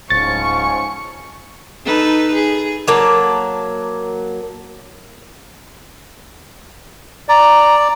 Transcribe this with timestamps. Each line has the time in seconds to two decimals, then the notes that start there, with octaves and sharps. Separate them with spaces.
0.10 D1 G#2 F3 C#4 C#6 A6 C#7
1.85 D#4 A4 B4
2.34 G#4
2.88 F#3 A#3 A5
7.29 D5 A#5